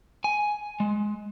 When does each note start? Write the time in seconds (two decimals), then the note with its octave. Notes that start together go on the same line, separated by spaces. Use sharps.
0.24 G#5
0.80 G#3